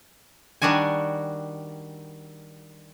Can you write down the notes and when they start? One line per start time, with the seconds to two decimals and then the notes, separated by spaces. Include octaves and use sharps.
0.62 D#3 G3 D4 F#4 G#5